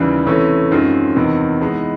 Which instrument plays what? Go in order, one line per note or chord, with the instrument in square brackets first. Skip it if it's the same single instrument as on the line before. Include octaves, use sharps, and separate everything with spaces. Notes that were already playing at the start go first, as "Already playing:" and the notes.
Already playing: [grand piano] D#2 C#3 E3 G3
C3 E3 A3 C#4
F#2 D#3 G#3 C4 F4
E2 C3 D#3
E3 G#3 B3 D#4